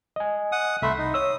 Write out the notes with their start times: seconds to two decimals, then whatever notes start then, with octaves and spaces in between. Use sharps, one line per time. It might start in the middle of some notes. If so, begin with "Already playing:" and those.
0.16 D#5 G#5
0.52 F#5 D#6
0.82 C2 A3 E5 B5 C6
0.98 D#4
1.14 C#5 D#6 E6